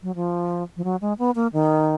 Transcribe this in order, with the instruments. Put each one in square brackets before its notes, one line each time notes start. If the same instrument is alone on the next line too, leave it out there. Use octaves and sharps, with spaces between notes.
[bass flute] F#3
F3
F3
F#3
G#3
B3
A#3
D#3